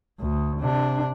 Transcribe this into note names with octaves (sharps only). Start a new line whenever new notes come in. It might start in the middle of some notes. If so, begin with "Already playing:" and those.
D2
C3 D4